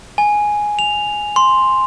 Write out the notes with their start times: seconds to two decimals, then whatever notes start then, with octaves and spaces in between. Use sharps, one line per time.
0.18 G#5
0.79 F7
1.36 C6